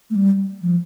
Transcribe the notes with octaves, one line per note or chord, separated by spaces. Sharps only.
A3
G3
F3